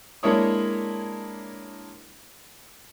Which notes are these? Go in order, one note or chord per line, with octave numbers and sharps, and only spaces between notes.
G#3 A#3 D4 E4 C#5 D#6